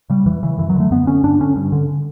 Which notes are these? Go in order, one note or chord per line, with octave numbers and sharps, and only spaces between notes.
C#3 G3
E2 E3
C#3 E3
F#2 E3
F#3
D3
A3
F#2 B3
D3 C#4
G2 D4
D3 C#4
G2
D3